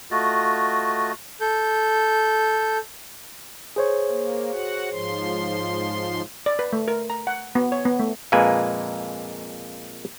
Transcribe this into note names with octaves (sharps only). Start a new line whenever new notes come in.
A3 F4 F#4 D#5
A4 G6
G#4 C5 C#5
A#3
F#4 F#5
G#2 F3 C6
D5
B4
A3
A#4
A#5
F#5
B3
C#5
B3
A3
F2 A#2 G#3 A#3 B4 G#5